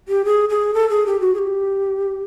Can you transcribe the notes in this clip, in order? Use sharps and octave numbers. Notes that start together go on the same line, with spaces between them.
G4
G#4
G#4
A4
G#4
G4
F#4
G#4
G4